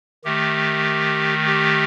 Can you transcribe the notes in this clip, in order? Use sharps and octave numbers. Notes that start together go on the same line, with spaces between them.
D#3 A3 G4
G4